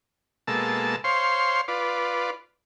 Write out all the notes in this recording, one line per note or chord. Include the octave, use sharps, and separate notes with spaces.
B2 G#3 A#3 A4 A5 E6
C5 C#5 F5 C6
F4 B4 D5